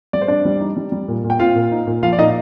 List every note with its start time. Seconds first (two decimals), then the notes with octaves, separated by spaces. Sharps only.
0.13 G3 D5
0.21 C5
0.28 C4 D4 D5
0.45 G3
0.61 D#4
0.77 G3
0.92 G3
1.08 A#2
1.24 A#2
1.30 G5
1.39 C4 F4 F5
1.55 A#2
1.72 D#4
1.87 A#2
2.03 F3 F4 F5
2.13 D5
2.19 A#2 D#4 D#5